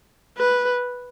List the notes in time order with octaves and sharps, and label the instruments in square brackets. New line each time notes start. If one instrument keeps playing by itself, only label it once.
[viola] B4